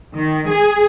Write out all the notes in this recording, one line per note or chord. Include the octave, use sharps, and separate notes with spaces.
D#3
G#4